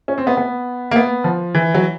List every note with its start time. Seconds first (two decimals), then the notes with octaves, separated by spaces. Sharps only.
0.08 C#4
0.18 C4
0.27 B3
0.37 B3
0.91 A#3
0.96 B3
1.24 F3
1.55 E3
1.74 F#3